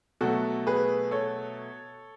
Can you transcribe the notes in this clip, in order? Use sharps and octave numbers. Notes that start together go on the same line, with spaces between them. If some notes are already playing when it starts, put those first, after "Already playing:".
B2 F#3 A3 F#4 A4
G#4 B4
A4 C#5